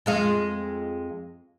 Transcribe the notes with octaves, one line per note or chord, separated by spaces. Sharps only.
F2 G#3 F4